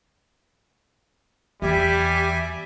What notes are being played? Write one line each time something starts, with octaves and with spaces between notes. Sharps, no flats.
E2 G3 G4 E5 G#5